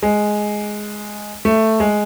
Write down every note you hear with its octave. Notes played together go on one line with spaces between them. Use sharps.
G#3
A3
G#3